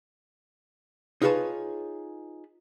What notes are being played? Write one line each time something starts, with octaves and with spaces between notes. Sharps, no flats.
D#4 F4 G#4 B4 C#5 A5